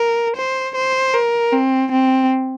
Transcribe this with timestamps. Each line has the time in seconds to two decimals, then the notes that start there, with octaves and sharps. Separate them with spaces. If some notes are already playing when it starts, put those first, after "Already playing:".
Already playing: A#4
0.36 C5
0.75 C5
1.14 A#4
1.52 C4
1.92 C4